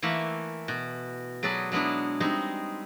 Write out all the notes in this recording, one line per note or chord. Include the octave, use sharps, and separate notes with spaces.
E3 A3 A#3 E5 F#5
B2
F#3 G#4 A4 B4 D5
F#3 G#3 B3 D4 E4
G3 G#3 C4 D#4 G#4